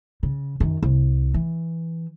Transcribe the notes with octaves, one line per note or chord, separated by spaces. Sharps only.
C#3
F#2 D#3
C2
E3